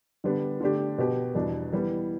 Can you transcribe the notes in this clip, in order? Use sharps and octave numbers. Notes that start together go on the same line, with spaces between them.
D3 G3 B3 D4 G4
D3 A3 D4 G4
B2 B3 G4
E2 B2 G3 D4
E3 G3 B3